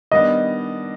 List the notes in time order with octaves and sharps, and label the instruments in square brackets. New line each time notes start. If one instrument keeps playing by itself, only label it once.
[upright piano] D#3 G3 B3 D4 [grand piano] D#5